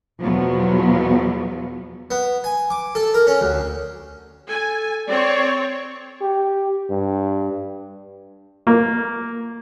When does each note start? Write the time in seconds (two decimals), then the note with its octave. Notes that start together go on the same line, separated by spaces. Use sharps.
0.22 E2 B2 F3 F#3 B3
2.11 B3
2.44 G#5
2.70 D6
2.95 A4
3.14 A#4
3.27 C#4
3.41 D2
4.49 A4 G#5
5.08 C4 C#5 D5
6.21 G4
6.90 G2
8.67 A#3